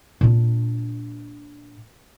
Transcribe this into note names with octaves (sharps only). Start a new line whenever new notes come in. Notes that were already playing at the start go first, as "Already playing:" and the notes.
A#2 D4